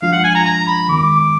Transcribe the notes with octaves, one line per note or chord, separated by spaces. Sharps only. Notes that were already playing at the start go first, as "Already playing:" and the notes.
F3 G#3 D4 F4 F5
F#5
G#5
A#5
A#5
B5
D#3 G#3 B3 D6